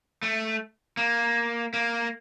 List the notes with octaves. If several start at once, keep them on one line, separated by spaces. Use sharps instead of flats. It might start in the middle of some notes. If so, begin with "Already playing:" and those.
A3
A#3
A#3